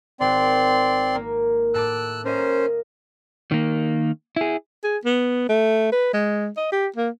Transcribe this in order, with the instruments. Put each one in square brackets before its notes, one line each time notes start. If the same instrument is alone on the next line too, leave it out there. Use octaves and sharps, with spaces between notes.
[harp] G#1 F#4 [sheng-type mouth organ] C4 D5 C6
[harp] A#3
[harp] A2 A5 D6 [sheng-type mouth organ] E6 F#6
[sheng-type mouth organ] C#4 C5 [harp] A#4 D#5 F5
[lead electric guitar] D#3 A#3
E4 G#4
[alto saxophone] G#4
B3
A3
B4
G#3
D#5
G4
A#3